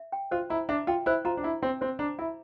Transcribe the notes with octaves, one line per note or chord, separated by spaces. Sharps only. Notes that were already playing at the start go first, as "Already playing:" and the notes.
Already playing: E5
G5
F4 C5
E4 A#5
D4 E5
F4 G5
E4 C5
F4 A#5
D4
E4 E5
C4 G5
C4 C5
D4 A#5
E4 E5